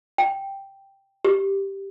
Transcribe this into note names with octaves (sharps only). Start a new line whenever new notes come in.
G5
G4